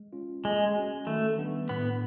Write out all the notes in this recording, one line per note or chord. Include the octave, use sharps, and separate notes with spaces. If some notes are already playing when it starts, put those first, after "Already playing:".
Already playing: G#3
C#4 F4
G#3 A#3
C#4 F#4
D#3 A3
G3 B3 D4
A2 B3